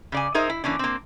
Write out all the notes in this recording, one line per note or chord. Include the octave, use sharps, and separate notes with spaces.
C#3 D5 G#5
D#4 G#4 A#4 C5 E5
E4
E3 A#3 C#4 D4
A#3 C4